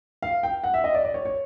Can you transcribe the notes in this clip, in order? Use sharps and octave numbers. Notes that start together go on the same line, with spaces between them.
F5
G5
F#5
E5
D#5
D5
D5
C#5
C#5